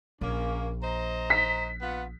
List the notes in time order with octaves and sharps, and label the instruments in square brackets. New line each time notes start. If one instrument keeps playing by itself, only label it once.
[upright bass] A#1 [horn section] A#3 C#4
[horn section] C5 D#5 A#5
[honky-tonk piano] B6
[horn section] B3 F4 F#5